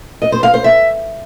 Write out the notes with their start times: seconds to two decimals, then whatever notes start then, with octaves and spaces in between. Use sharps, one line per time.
0.22 D#5
0.32 C5
0.43 F5
0.54 C5
0.64 E5